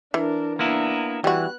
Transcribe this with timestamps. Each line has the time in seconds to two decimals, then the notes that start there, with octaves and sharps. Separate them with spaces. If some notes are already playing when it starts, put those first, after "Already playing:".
0.14 E3 D4 A#4
0.59 A#3 B3 D4 E4 A#5
1.24 E3 G3 B3 F#4 F#6